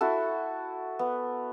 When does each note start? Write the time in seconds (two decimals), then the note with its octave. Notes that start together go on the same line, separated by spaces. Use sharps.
0.01 E4 F#4 A4
0.99 B3